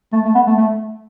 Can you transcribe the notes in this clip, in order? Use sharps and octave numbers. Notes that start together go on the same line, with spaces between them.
A3
A3
B3
A3
A3